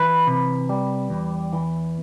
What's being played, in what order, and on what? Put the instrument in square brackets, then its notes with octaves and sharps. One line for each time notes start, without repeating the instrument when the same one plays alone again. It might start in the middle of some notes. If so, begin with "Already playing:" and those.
Already playing: [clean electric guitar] E3 B4
C3
G3
E2
E3